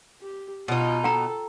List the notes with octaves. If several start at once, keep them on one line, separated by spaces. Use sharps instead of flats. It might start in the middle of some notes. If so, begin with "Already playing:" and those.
G4
B2 D#4 F4
A4 G5 A#5